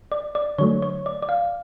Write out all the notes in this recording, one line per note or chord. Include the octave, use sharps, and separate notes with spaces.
D5
D5
D3 F#3 A3 C#5
C#5
D5
D5
F5